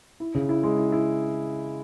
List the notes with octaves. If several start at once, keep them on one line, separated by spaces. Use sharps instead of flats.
E4
C#3
E4
G#3
E4
E4